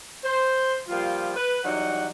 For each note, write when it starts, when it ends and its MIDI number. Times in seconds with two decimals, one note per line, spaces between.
0.24 0.80 72
0.88 1.31 53
0.88 1.31 55
0.88 1.31 58
0.88 1.31 65
1.35 1.60 71
1.64 2.08 52
1.64 2.08 54
1.64 2.08 55
1.64 2.08 63
1.64 2.08 78